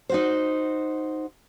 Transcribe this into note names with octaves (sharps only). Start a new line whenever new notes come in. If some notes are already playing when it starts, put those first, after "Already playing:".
D#4 F#4 C5